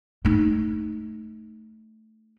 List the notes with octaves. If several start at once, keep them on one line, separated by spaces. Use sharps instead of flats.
A3 D#4